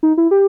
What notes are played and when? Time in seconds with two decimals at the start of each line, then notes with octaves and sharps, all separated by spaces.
0.03 D#4
0.17 E4
0.31 G4